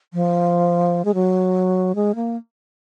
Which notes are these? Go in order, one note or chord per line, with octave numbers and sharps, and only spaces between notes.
F3
G#3
F#3
G#3
A#3